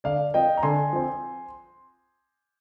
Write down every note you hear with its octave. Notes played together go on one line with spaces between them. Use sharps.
D3 D5 F5
F3 C4 D#5 G5
A#5
D3 G#5 C6
F3 C4